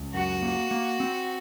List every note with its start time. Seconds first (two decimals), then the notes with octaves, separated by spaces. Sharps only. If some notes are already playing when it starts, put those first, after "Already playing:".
Already playing: C#2
0.14 F#2 F#4
0.42 A#3
0.71 A#3
1.00 C4